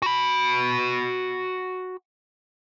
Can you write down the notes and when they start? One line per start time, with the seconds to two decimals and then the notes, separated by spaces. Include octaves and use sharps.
0.02 F#4 B5